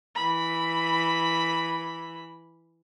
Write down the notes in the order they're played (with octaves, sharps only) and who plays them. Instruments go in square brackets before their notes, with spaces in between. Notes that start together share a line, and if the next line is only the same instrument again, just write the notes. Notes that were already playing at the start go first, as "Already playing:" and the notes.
[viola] E3 B5